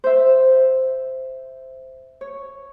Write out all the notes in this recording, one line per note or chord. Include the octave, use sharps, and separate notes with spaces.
C5 E5
C#5